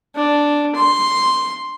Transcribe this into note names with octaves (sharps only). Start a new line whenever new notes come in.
D4
C6